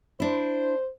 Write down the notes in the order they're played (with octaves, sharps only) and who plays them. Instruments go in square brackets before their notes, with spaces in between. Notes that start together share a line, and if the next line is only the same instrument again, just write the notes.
[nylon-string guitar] D4 E4 [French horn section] C5